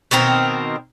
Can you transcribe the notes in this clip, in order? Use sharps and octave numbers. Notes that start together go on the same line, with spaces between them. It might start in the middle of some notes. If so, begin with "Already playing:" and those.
B2 D#3 C4 A#4